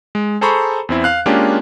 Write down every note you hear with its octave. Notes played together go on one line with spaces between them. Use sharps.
G#3
G#4 A4 C5 A#5 B5 C#6
E2 C4 E4
F5 F#6
G#3 A#3 C#4 D4 F4 G4